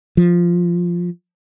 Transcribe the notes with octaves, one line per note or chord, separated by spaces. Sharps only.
F3